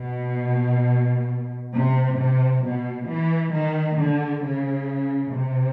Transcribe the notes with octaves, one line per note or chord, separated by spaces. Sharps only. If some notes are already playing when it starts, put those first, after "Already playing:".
Already playing: B2
C3
C3
B2
E3
D#3
D3
C#3
C3